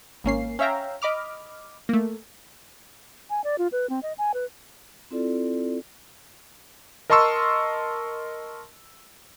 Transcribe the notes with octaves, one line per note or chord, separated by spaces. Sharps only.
G#1 A#3 C#4 C7
C#4 C#5 E5 F5 G5 A#5
D#5 B5 D6 F6
A3 A#3
G#5
D5
F4
B4
C4
D#5
G#5
B4
C4 E4 F4 A4 D5
A#4 D#5 A5 C6 C#6 E6